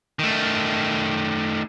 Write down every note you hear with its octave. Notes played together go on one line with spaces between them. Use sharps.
D#3 A3